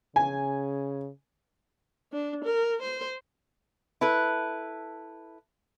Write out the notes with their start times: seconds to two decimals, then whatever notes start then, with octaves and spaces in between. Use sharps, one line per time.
0.16 C#3 G#5
2.12 D4
2.44 A#4
2.82 C5
4.01 E4 A4 B4